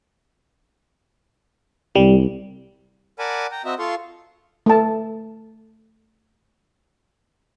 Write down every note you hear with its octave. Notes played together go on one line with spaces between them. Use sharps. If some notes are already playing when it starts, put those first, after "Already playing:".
C2 G3
A#4 D5 F#5 G#5 A5 B5
G5 A#5
C4 F#4 D#5 E5 A#5
F4 A4 F5 C6 C#6
A3 A5